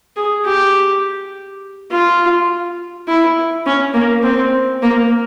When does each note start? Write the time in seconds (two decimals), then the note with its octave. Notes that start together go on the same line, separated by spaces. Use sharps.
0.16 G#4
0.46 G4
1.91 F4
3.08 E4
3.66 C#4
3.94 A#3
4.23 C4
4.82 A#3